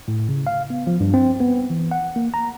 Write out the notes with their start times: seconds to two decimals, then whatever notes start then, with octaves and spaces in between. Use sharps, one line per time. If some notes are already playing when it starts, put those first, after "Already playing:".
0.08 A2
0.29 C#3
0.47 F5
0.70 B3
0.87 F3
1.00 G2
1.14 C4
1.40 B3
1.70 E3
1.91 F#5
2.16 A#3
2.34 A#5